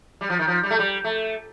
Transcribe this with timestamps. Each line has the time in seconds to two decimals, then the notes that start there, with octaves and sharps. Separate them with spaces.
0.21 G3
0.30 F3
0.39 D#3
0.47 F3
0.63 G3
0.70 A3
0.79 G3
1.04 A3